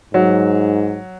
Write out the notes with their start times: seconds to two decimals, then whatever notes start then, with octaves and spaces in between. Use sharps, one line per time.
0.14 G#2 F#3